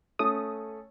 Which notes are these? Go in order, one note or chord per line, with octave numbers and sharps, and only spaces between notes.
A3 C#4 D#6